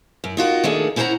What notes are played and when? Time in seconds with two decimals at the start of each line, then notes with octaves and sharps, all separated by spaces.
0.24 F#2
0.37 D#4 F4 F#4 A#4
0.64 D#3 A3 A#3 D4 G#4 A4
0.96 C#4 E4 C5 D5 F#5 A#5